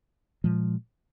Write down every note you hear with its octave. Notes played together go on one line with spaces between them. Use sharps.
A#2 F3 G#3